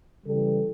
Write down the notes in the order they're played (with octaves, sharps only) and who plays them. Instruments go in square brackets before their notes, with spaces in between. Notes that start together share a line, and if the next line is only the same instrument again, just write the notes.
[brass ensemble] C#3 E3 G3 A4